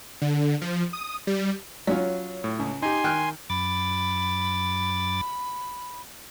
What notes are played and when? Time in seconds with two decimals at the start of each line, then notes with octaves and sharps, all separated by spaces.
0.22 D3
0.61 F3
0.93 D#6
1.27 G3
1.87 F#3 C#4 F4
2.44 A2
2.59 C#2
2.82 D#4 G4 G#5 C6
3.04 D#3 G5 F6 F#6
3.50 F#2 B5 D6 A6